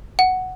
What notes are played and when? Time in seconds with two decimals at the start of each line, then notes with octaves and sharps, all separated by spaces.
0.19 F#5